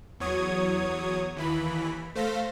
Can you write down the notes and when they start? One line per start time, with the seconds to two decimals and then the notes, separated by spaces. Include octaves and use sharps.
0.20 E2 F#3 C#5 D#6 G#6
1.36 D#2 E3 B5
2.15 A3 C5 F5 A#6 B6